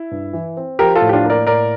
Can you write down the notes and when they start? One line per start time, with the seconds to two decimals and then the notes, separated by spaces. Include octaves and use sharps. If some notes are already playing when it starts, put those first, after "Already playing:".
Already playing: E4
0.11 G2
0.33 E3
0.57 C4
0.79 F3 G4 A#4
0.95 F4 A4
1.01 A2
1.09 G4
1.13 D4 F4
1.24 A#3
1.30 A#4 D5
1.47 A2 A#4 D5